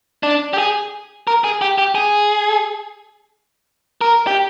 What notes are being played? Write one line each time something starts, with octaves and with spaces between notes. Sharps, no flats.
D4
G4
G#4
A#4
G#4
G4
G4
G#4
A#4
G4